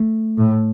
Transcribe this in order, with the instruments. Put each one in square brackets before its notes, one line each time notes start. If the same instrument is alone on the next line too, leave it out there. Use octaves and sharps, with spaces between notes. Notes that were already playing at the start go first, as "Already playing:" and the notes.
Already playing: [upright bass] A3
[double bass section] A2